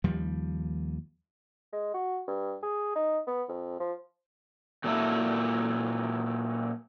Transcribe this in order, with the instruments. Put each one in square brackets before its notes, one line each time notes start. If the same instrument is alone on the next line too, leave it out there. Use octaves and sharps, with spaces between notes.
[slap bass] D#2 F3 G3
[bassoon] G#3
F#4
G2
G#4
D#4
B3
F2
F3
[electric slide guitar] A#2 F#3 A#3 E4 A4